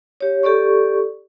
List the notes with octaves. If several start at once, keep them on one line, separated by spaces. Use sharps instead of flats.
G4 C#5
G4 A4 D5 C#6